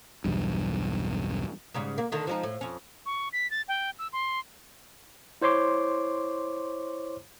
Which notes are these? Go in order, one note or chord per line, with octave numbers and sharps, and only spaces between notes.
B1 E2 G2
G#2 C#3 G3
A#3
D3 D#3 A3
F3 G#3 D#4
A2
F2 C#4
C#6
B6
A6
G5
E6
C6
E4 C5 C#5 C6 D6